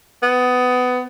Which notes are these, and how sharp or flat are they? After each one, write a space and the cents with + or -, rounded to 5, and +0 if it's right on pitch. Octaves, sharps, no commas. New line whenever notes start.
B3 +20